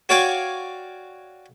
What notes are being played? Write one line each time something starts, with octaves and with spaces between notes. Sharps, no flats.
F#4 C#5 D5 F5 G5 G#5